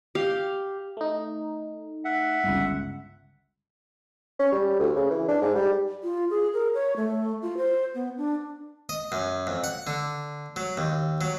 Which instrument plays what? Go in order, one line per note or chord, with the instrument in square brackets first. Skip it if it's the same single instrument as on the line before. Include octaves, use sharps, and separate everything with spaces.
[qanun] G4 F5
[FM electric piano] A3 D#4
[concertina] E5 F#5
[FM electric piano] G1 C#2
[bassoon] C#4
G3
D2
C#3
E3
D4
G#2
G3
[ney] F4
G#4
A#4
C#5
A3
F4
C5
B3
D4
[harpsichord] D#5
F#2
F2
F#5
D3
F#3
D#2
F#3